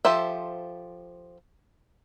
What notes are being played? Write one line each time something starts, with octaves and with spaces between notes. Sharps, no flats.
F3 G4 A4 C5 E5